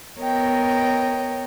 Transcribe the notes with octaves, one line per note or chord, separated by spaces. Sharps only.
B3 A#4 C#5 D#5 G5